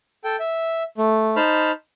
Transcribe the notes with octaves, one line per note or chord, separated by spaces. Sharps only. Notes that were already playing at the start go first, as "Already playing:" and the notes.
A4 G5
E5
A3
D#4 C5 A5 B5 F6